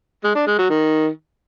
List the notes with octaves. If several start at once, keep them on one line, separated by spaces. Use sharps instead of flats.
G#3
D4
G#3
F#3
D#3